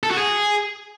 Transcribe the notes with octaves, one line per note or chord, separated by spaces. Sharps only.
A4
F#4
G#4